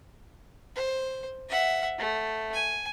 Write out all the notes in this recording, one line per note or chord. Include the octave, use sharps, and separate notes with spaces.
C5
E5 F#5
A3
G#5